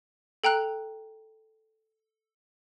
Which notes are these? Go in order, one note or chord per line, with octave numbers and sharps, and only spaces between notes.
A4 G5 A#5 F#6 D7